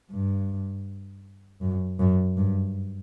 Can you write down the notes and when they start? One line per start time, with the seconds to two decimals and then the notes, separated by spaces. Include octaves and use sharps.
0.11 G2
1.61 F#2
1.99 F#2
2.37 G2